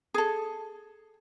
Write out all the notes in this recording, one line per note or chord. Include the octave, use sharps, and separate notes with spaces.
G#4 A4